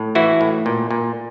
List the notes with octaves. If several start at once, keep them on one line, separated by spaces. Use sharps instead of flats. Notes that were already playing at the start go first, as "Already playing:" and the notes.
Already playing: A2
E3 E4 F#4
A2
A#2
A#2